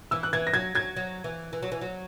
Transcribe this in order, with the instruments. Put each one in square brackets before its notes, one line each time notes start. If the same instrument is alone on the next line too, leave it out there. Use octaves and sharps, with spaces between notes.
[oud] E3 [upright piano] E6
[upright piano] F#6
[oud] E3 [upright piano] G#6
[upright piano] A#6
[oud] F#3 [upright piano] G#6
[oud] F#3 [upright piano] G#6
[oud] F#3
E3
E3
F#3
E3
F#3